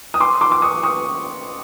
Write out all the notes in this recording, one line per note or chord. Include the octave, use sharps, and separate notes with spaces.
D#6
C6 D6
C6 D6
D6
C#6 D#6
C#6 D#6